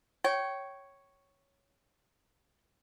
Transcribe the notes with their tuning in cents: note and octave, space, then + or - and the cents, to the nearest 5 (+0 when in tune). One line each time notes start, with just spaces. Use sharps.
C#5 +0 G5 -25